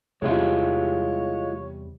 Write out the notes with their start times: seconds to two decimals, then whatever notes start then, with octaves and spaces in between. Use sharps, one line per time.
0.22 E2 C3 G3 G#3 E4 F4 C#5